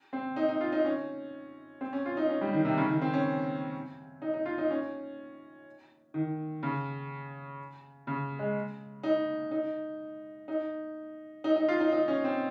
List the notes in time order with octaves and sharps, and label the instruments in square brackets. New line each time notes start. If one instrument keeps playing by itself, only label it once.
[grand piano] C4
D#4
D#4
F4
D#4
C#4
C4
C#4
F4
D#4
C#4
G3
D#3
C3
C#3
D#3
C4
C#4
D#4
D#4
F4
D#4
C#4
D#3
C#3
C#3
G#3
D#4
D#4
D#4
D#4
D#4
F4
D#4
D#4
C#4
C4